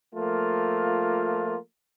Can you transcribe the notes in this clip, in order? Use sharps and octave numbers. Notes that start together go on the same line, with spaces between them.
F3 A3 A#3 F4